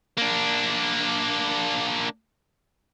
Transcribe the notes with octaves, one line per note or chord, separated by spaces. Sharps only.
A#3 D4